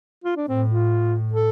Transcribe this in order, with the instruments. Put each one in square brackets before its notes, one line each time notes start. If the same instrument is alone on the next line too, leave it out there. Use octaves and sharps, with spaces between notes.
[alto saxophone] F4
D4
[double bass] A2 [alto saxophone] C4
[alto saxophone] F4
A4